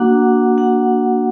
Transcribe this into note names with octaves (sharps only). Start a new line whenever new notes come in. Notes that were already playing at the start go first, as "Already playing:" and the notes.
Already playing: A#3 D4 F#4 F#5
F#5